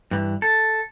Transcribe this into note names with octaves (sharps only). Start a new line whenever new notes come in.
G2 E3
A4